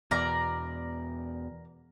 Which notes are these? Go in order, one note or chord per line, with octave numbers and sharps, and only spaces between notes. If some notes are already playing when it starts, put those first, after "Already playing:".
E2 B2 A#4 D5 A#5